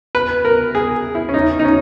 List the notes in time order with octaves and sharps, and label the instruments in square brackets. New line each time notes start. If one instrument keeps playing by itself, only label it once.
[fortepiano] B4
A#4
G#4
E4
C#4
D#4
D#4
C#4